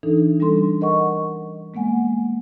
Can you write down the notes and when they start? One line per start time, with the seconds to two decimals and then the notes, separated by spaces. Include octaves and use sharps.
0.03 E3 D4 D#4 A4
0.40 G3 C#4 D4 A4 C6
0.81 A#4 D#5 F#5 C#6
1.74 G#3 A#3 B3 F#5 G#5